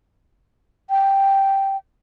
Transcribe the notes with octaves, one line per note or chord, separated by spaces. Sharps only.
G5